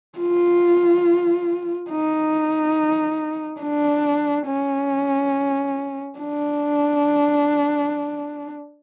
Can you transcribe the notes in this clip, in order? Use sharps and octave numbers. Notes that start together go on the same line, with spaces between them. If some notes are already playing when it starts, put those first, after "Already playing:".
F4
D#4
D4
C#4
D4